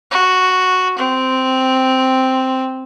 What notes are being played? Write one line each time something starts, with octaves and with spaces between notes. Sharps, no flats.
F#4
C4